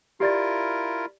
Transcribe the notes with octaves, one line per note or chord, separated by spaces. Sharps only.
E4 F4 G4 A#4 D5 A6